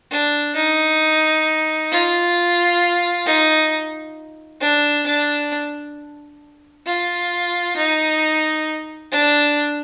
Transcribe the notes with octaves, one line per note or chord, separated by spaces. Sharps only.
D4
D#4
F4
D#4
D4
D4
F4
D#4
D4